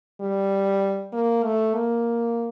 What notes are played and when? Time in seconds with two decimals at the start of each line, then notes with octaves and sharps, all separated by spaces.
0.21 G3
1.13 A#3
1.44 A3
1.75 A#3